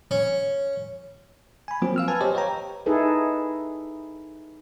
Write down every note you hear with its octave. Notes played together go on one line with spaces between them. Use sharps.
C#4
G#5 B5
F3 F#3 A#3 C4 F4
F5 E6 F6
B4 G#5 A5
G4 C5 C#5 D#5
B4 C#5 F5 G5 A#5
D#4 E4 G#4 A4 B4